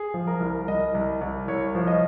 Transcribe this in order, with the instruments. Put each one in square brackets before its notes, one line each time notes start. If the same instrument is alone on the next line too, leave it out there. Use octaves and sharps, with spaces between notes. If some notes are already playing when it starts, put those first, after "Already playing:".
Already playing: [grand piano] G#4
F3
A#4
C2
C2 D#5
C2
C2
C2 C#5
F3
D#5